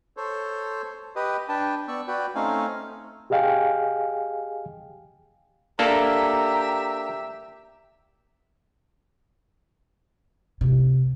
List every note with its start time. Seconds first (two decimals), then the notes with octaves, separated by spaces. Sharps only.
0.17 A4 C5 C#5
1.16 G4 B4 D#5
1.49 D4 B4 G5 A5
1.88 B3 D5 C#6 E6
2.07 F#4 B4 D5 G5
2.35 A3 C4 C#4 D#4 F5 G#5
3.30 G4 G#4 D#5 F5 G5 G#5
5.79 A#3 D4 G4 A4 E5 A#5
10.61 C3